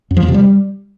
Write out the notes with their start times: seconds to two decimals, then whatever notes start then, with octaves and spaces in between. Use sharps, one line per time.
0.11 F#2
0.17 F3
0.22 E2
0.28 C3
0.34 G3